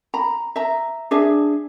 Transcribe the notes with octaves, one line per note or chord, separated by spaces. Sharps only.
A#5 B5
E5 A#5
D4 G#4 E5